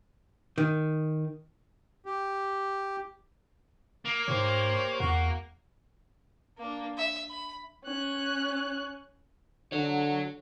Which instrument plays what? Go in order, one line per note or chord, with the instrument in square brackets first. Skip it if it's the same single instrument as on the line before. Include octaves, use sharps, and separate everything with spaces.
[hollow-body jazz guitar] D#3
[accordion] G4
[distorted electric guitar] A#3
[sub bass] G#2 [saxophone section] G4 C5 C#5
[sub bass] E2 [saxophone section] F#4
[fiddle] A#3 D4
E5
B5
[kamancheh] C#4 F#6
[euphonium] D3 [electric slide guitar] F#4 C#5